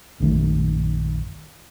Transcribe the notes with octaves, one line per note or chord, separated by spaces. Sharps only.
A#1 F#2 D#3 A3